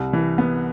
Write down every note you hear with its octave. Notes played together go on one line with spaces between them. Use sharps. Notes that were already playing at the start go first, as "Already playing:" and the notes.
Already playing: C2
E3
B3